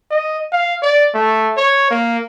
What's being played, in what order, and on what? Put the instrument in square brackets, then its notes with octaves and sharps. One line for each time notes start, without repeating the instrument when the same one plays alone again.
[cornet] D#5
F5
D5
A3
C#5
A#3